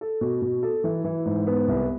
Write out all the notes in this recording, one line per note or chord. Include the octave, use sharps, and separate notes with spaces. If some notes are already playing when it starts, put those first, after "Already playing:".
A4
B2
B2
A4
E3
E3
G#2
B3
C2